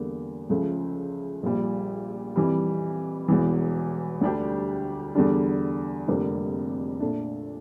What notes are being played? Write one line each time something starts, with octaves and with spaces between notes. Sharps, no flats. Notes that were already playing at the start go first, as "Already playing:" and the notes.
Already playing: E2 D3 G3 A#3
C#2 C#3 F3 A3 C#4
A#1 A#2 G3
F2 E3 G3
E1 E2 E3
D2 D3 G3 D4 G4
E2 D3 G3 D4
F1 F2 D3 G3 A#3
A#2 A3 D4